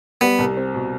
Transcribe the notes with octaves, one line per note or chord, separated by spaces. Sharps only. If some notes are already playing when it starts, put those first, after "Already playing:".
G3 B3
C2
C4
B2